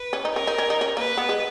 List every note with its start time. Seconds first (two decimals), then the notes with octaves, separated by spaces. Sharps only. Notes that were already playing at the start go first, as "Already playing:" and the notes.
Already playing: B4
0.13 C#4
0.25 D#4
0.34 C#4 A#4
0.47 D#4
0.58 C#4
0.70 D#4
0.81 C#4
0.97 A#3 B4
1.17 B3
1.29 G#3